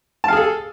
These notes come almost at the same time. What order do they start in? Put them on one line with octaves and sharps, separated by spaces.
A5 F5 G#4 A4